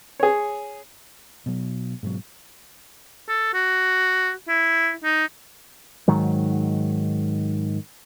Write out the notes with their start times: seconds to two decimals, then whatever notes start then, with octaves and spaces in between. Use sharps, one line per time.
0.20 G#4 C#5
1.46 B2 F#3
2.03 G#2 B2 D3 F#3
3.29 A4
3.54 F#4
4.48 E4
5.04 D#4
6.08 G#2 D#3 F#3